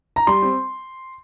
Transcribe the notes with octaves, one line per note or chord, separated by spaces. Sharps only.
A#5
G3 C6
C4